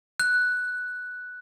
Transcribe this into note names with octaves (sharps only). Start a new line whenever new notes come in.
F#6